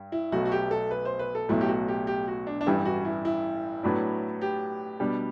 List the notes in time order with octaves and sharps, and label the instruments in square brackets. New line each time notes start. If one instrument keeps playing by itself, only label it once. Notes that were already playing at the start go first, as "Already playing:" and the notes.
Already playing: [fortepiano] G2
[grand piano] E4
[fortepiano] B1 B2 F#3 A3 [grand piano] F#4
[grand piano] F#4
G4
A4
B4
C5
B4
A4
[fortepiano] B1 A2 F#3 A3 [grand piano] E4
[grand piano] G4
F#4
G4
G4
F#4
D4
D4
[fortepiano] A1 G2 E3 G3 [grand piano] E4
[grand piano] F#4
E4
E4
[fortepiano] A2 F#3 B3 D4
[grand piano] G4
[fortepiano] B2 G3 D4